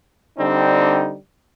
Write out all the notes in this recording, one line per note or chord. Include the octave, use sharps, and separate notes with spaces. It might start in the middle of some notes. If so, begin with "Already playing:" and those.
D3 G3 C4 D4 D#4